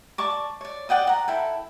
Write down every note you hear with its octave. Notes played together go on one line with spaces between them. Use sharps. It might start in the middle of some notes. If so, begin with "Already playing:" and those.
D5 A5 C#6 D6
C#5 D5
D5 F#5 G5 D#6
F#5 A#5
E4 A4 G5